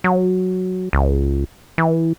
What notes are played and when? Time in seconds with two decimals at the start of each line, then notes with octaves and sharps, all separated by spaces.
0.04 F#3
0.93 C#2
1.78 E3